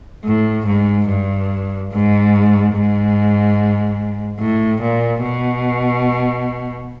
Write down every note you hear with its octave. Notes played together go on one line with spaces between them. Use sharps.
A2
G#2
G2
G#2
G#2
A2
A#2
B2